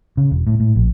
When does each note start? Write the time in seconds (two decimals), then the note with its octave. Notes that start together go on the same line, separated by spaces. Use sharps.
0.17 C#3
0.31 E1
0.47 A2
0.60 A2
0.76 A#1